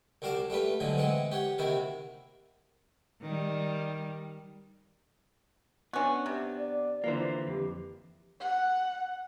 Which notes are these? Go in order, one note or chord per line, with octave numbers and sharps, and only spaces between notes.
C2 G3 F#4 F5 A5 D6
G3 A3 F4 B4
A2 D3 F3 F#3 G#3
E3 G#3 C4 F#5
G4 C#5 F#5
C3 D#3 A#3 E4 F#4
D#3 G3
B3 C#4 D4 F#4
C3
D5
D3 E3 A#3 F4 A#4 C5
F2 G4
F#5